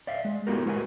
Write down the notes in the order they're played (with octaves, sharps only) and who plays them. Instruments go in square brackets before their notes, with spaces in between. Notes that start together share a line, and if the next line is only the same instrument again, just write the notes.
[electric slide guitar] D5 E5 F5
G#3
A3 B3 E4 F#4 G4 A#4
G#3 F#4 A#4 B4 F#5 G#5